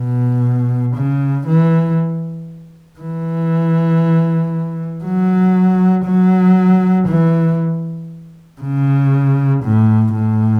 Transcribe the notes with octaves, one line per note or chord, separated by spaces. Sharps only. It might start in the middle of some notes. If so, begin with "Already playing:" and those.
Already playing: B2
C#3
E3
E3
F#3
F#3
E3
C#3
A2
A2